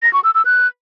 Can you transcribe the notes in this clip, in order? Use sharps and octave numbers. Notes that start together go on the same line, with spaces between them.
A#6
C#6
E6
E6
F#6